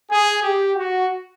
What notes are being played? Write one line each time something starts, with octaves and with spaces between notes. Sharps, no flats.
G#4
G4
F#4